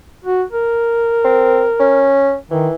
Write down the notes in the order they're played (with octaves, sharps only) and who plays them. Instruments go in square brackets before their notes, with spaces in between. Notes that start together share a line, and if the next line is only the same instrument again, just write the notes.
[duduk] F#4
A#4
[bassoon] C4
C#4
[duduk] D#3 [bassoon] E3